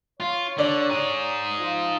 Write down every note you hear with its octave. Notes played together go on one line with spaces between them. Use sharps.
F4 C#5
D3 D5
D#4 G#4
F3 F4